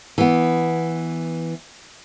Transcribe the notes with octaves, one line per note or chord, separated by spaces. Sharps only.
E3 B3